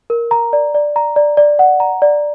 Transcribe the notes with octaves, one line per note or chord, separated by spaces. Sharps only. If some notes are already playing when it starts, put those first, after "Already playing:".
A#4
A#5
D5
D5
A#5
D5
D5
F#5
A#5
D5